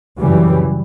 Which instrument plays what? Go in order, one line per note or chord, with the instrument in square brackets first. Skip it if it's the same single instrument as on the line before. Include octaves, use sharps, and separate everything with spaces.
[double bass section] F#2 C#3 E3 G3